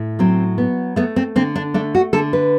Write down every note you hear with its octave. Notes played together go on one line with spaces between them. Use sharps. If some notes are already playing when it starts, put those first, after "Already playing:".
Already playing: A2
F#3 C4
B3
A3 B3
C4
D3 C4
D4
A3 D4
F#4
D3 A4
B4